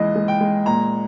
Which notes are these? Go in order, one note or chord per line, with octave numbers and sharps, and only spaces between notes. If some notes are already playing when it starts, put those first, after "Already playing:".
Already playing: C#2 E3 G#3 D#5
G#3
G5
G#3
A#2 A#5